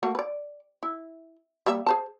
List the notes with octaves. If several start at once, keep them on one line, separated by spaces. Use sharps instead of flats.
A3 A#3 F#4
B4 D5
E4
G3 A#3 E5
G#4 C5 A5